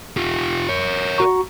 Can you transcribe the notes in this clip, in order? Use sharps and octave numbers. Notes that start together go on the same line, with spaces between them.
F4 G4
A#4 C#5
F#4 A#5 C#6